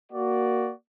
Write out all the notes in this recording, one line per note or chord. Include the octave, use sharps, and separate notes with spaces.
A#3 F#4 D5